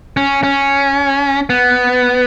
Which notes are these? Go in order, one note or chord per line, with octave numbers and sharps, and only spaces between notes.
C#4
C#4
B3